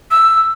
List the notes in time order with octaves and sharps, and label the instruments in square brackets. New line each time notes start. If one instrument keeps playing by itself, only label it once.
[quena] E6